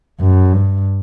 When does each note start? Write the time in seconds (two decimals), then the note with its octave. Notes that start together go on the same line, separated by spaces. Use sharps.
0.21 F#2
0.53 G2